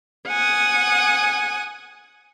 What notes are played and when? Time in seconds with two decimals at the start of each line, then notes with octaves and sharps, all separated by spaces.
0.27 F#5 G#5 D#6